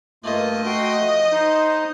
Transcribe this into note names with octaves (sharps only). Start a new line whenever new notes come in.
G2 A3 A#3 F4 D#5
F#4 G5 C6
F3
D#4 C5